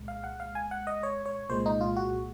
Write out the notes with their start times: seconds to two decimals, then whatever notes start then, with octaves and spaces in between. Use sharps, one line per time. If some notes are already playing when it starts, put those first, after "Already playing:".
Already playing: C2 A#2 G#3
0.08 F5
0.24 F#5
0.40 F5
0.55 G#5
0.71 F#5
0.87 D#5
1.03 C#5
1.26 C#5
1.49 C2 A#2 G#3 C5
1.66 D#4
1.81 F4
1.96 F#4